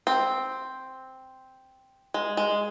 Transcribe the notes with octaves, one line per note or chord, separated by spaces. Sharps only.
C4
G#3
G#3